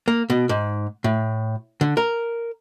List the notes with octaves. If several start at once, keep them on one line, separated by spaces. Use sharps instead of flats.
A#3
B2
G#2
A2
D3
A#4